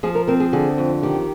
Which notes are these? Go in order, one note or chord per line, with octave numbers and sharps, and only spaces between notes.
F3 G#4
A#4
C4 A#4
G#4
D3 G#4
F2
D#3 G4